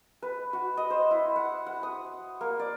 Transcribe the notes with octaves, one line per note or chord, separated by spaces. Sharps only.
B4
F#4
D#5
C5
E4
F#5
F#5
D#6
A#3
D5